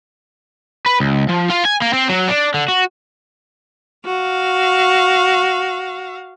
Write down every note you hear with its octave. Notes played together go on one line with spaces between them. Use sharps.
B4
C#2
F3
F4
G#5
A#3
C4
F#3
D4
D3
F#4
F#4 F5